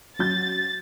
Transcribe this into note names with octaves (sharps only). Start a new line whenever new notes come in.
F#3 C#4 G6 A6